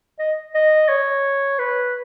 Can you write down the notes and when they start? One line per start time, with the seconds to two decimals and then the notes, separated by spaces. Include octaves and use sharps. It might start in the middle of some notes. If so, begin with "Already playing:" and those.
0.19 D#5
0.54 D#5
0.89 C#5
1.59 B4